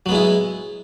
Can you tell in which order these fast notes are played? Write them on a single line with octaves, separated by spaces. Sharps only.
F#3 B3 G#3 E4